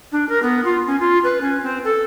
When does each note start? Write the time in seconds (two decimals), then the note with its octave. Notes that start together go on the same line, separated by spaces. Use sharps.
0.11 D4
0.28 A#4
0.42 B3
0.64 F4
0.86 C#4
0.99 F4
1.23 B4
1.41 C#4
1.62 C4
1.84 A4